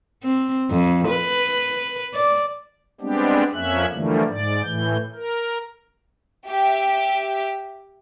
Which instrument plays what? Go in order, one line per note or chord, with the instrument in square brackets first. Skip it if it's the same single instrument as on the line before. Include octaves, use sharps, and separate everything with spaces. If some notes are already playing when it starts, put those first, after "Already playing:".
[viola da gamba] C4
F2
B4
D5
[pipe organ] G3 G#3 B3 C4 D4 G4
F2 F3 A#3 C#4 E5 F#6
D3 E3 F3 G3 A3 A#3
G#2 D5
A2 E3 G6
A#4
[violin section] G4 E5